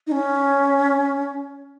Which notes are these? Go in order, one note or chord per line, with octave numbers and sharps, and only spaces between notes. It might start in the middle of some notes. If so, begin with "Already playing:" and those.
D#4
C#4